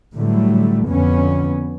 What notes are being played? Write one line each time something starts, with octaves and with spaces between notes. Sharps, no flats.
A2 D3 E3 F#3 G3 A3
F2 D3 B3 C#4